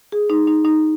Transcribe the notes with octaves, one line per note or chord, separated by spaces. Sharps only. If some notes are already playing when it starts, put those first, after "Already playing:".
G#4
D#4
D#4
D#4